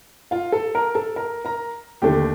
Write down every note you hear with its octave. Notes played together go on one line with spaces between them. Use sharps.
F4 F5
A4 A5
A#4 A#5
A4 A5
A#4 A#5
A#4 A#5
D#2 D3 A3 D4 G4 G5